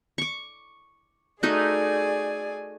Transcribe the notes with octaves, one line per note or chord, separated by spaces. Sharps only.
C#6 D6
A3 D#4 F#4 G#4 D5 G#5